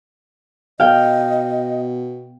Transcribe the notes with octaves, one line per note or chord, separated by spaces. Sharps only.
B2 D#5 F5 G5